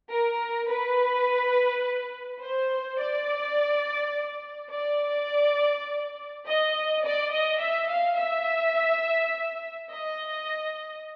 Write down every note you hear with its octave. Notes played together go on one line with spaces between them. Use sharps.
A#4
B4
C5
D5
D5
D#5
D5
D#5
E5
F5
E5
D#5